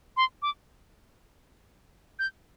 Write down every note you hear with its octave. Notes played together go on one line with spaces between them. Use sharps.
C6
D6
G6